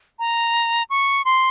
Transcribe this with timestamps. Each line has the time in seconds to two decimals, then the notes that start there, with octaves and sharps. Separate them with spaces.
0.19 A#5
0.90 C#6
1.25 C6